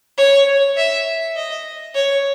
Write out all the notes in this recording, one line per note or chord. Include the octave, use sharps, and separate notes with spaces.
C#5
E5
D#5
C#5